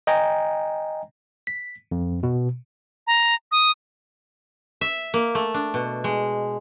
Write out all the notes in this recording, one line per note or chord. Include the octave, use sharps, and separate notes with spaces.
D#5 G5 G#5 A#5
B6
F2
B2
A#5
D#6
E5
A#3
A3
D4
B2
G#3